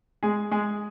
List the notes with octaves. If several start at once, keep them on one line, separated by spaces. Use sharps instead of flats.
G#3 G#4
G#3 G#4